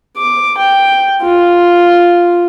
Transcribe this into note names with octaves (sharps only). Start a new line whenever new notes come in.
D6
G5
F4